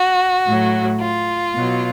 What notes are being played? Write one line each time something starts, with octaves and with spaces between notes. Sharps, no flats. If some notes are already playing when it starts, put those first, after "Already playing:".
Already playing: F#4
A2 F#3
F4
B2 F#3